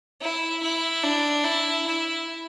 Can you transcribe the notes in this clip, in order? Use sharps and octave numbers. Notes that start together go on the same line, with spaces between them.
E4
E4
D4
E4
E4